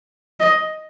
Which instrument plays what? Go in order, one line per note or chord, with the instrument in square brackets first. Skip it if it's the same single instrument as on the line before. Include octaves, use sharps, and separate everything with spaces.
[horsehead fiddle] D#5